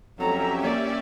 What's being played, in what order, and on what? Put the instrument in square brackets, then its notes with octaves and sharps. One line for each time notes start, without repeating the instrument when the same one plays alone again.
[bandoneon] F2 F#3 [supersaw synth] C#4 G4 E5 [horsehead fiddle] A4 A#5
[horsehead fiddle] A#3 D5